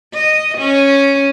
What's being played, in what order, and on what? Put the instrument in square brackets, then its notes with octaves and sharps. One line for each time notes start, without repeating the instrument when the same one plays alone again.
[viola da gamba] D#5
C#4